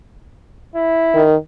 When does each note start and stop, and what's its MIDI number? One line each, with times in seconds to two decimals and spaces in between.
0.75 1.24 64
1.14 1.35 51